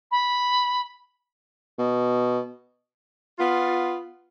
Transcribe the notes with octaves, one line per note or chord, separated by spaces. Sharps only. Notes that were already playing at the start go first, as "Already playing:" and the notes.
B5
B2
B3 F4